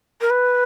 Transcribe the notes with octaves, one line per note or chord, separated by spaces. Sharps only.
A#4
B4